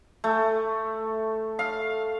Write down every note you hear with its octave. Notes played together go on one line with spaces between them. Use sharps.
A3
F5